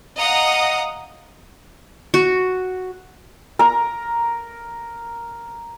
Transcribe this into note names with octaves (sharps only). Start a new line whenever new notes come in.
D#5 F5 F#5 A#5 D#6
F#4
A#4 A#5